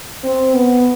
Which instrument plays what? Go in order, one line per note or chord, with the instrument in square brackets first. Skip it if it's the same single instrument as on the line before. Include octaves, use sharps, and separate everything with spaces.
[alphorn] C4
B3